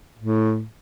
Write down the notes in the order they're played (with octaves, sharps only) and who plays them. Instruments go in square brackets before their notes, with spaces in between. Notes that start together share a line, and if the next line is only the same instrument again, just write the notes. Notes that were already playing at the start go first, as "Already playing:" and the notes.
[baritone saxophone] A2